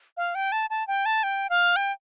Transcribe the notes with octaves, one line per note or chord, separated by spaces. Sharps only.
F5
G5
A5
A5
G5
A5
G5
F5
G5